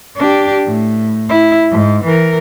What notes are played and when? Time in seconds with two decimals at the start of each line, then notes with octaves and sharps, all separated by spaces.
0.17 D4 G4
0.66 A2
1.29 E4
1.72 G#2
2.05 E3 A#4